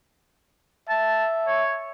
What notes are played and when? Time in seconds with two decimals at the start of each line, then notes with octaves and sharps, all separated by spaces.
0.89 E5 A5
1.47 C#5